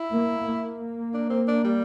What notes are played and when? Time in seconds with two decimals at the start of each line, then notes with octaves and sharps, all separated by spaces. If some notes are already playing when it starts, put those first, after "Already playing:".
Already playing: E4
0.12 A#3
0.46 A#3
1.14 D4
1.30 C4
1.48 D4
1.64 G3